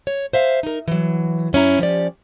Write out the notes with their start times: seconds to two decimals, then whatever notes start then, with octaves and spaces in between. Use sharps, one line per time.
0.07 C#5
0.33 C5 E5 F5
0.63 D#4 A#4
0.88 E3 F#3
1.53 F#2 C#4 E4 A#5
1.79 F3 C#4 G4 D5